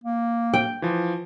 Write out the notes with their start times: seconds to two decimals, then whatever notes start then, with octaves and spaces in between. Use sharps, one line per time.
0.04 A#3
0.54 G5
0.82 E3 F3